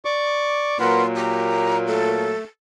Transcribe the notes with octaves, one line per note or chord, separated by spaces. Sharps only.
D5 C#6 D6
A#2 F#3 A#3 A#4 B4 F#5 C6
G4 A#5
A3 A4